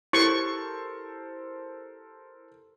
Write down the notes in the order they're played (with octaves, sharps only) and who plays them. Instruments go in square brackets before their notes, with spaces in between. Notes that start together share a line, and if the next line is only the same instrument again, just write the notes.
[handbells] E4 G4 [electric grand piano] A4 A#4 C5 [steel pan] C#6